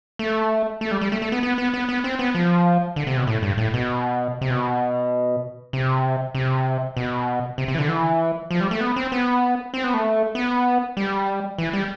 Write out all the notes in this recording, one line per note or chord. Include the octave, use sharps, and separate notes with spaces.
A3
A3
G3
G3
A3
A3
B3
B3
B3
B3
B3
C4
B3
F3
D3
C3
B2
A2
G2
A2
B2
C3
B2
C3
C3
B2
C3
C3
E3
D3
E3
F3
G3
A3
B3
C4
B3
C4
B3
A3
B3
G3
E3
G3